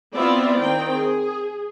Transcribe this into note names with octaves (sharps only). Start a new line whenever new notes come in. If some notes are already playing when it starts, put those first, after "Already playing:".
B3 C4 E4 F4 D5 E5
D#3 C4 G5
G#4